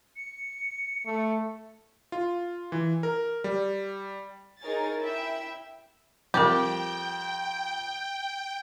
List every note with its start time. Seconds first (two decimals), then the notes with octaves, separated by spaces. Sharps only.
0.16 C#7
1.06 A3
2.12 F4
2.72 E3
3.03 A#4
3.44 G3
4.61 D#4 G#4 A#4 C#5 G#5 A6
4.98 E4 E5 G5
6.34 F2 G3 C4 G4 A#4 G5